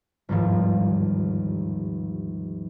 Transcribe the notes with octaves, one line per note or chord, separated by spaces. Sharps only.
G1 D#2 G#2 F3